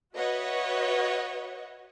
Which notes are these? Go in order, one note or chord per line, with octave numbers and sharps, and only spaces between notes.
F#4 B4 C#5 D#5 E5 F#5